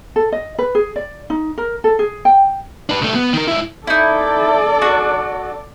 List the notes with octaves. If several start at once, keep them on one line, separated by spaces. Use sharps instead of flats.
A4
D#5
B4
G#4
D5
D#4
A#4
A4
G#4
G5
D4 B4
C2 A3
B3
D#3 A#4
G#2 E4
D#4 E4 A4 D5
D4 F#4